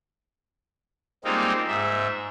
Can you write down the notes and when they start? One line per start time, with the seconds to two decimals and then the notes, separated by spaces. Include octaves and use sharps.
1.25 G3 G#3 A#3 C4 D#4 F4
1.67 G#2 E5